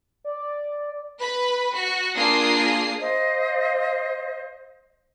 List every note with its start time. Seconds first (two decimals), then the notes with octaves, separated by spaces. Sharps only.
0.24 D5
1.19 B4 B5
1.73 F#4
2.15 A#3 D4 F4 G#4 D#6 C7
3.00 C5 D#5 F5